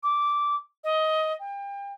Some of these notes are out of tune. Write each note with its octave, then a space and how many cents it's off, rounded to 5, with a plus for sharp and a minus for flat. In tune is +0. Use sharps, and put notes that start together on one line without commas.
D6 -10
D#5 +15
G5 +35